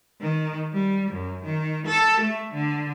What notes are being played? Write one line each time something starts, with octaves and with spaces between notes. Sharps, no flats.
D#3
G3
F#2
D#3
A4
A3
D3